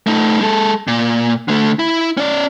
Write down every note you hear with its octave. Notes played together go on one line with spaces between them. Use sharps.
A3 D#4
G#3 A4
A#2
D3 A3
E4
C#4 D5